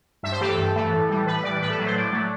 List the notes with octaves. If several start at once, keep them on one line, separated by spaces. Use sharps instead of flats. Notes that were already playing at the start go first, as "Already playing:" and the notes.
G2 E5
C5
E3 A3 G4
A4
G2
E3 A3
A2
E3 G3
A2 B4
E3 G3 D5
A2 B4
A4
F#3 A3
C5
A2 D5
F#3 A3